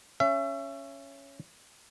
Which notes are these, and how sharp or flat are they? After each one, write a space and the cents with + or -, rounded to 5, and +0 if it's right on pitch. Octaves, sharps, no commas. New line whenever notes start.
C#4 +0 E5 +35